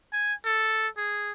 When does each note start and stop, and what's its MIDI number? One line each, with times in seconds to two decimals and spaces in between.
0.13 0.34 80
0.45 0.88 69
0.97 1.32 68